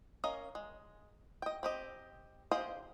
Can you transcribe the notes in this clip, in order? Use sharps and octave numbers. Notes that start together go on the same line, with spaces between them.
C#4 A#4 D#5 F5
G#3
D#5 G5
C4 G4 D#5
G4 G#4 C5 D#5 F5